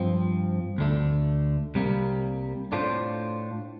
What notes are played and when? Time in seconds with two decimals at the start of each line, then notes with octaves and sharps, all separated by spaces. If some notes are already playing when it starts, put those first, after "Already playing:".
Already playing: G2 F3 C4
0.78 D2 D3 A3
1.75 C2 C3 G3 A#3
2.72 A2 A3 D4 F4 C5